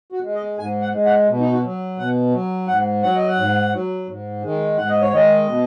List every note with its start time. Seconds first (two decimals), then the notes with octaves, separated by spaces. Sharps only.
0.12 F#4
0.24 G#3
0.35 D#5
0.58 G#2 G#5
0.81 F#5
0.93 G#3
1.05 F#5
1.28 B2
1.40 D#4
1.52 F#4
1.64 F#3
1.98 B2 F#5
2.33 F#3
2.67 G#2 F#5
3.03 F#3 F#5
3.16 D#5
3.28 F#5
3.38 G#2
3.73 F#3
4.08 G#2
4.42 D#3 G#3
4.77 G#2 F#5
4.89 D#5
5.01 C#5
5.12 D#3 G#3 D#5
5.47 B2